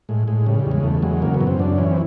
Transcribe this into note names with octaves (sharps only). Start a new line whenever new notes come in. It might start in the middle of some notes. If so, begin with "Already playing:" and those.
A2 G#3
A2 G#3
C#3 G3
G#3
G3
E2
G#3
E2 A3
F#3 G#3
C#3 A#3
B3
F#2
C4
F#2 D4
E3 C#4
C4